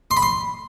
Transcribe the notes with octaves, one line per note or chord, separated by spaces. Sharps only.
C6
B5
C6